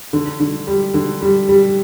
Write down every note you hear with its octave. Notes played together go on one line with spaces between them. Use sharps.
D3
D3
G3
D3
G3
G3